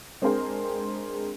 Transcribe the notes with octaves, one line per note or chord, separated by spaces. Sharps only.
G#3 C4 D4 G#4 A#4 C5